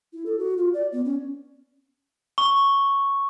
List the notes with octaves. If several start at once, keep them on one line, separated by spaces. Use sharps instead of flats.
E4
A4
F#4
F4
D5
B3
C#4
C#6